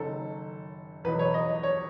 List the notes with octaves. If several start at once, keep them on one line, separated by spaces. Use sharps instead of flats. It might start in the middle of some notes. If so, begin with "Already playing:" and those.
Already playing: F#1 F#2 D#3 F#3 A4
E2 B2 F#3 B4
C#5
D#5
C#5